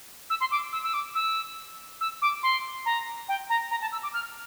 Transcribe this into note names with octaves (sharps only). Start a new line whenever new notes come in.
E6
C6
D6
E6
E6
D6
E6
E6
D6
C6
A#5
G5
A#5
A#5
A5
E6
D6
F6